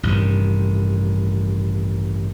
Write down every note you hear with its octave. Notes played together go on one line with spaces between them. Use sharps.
A1 G2 C3 D#3